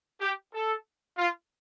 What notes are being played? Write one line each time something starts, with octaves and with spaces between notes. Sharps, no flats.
G4
A4
F4